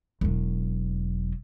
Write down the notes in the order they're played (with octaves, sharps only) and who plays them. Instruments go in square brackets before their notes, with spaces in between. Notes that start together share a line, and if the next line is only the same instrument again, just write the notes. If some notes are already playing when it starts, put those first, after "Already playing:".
[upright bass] E1 F#3